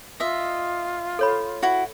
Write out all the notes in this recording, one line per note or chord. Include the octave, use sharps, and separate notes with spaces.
F4 D#5 E5
A4 C#5 B5
E4 F#4